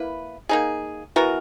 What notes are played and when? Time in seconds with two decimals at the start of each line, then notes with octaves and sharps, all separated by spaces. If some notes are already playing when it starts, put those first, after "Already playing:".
Already playing: A#3 E4 B4
0.49 A#3 D#4 G#4
1.16 E3 B3 F#4 A#4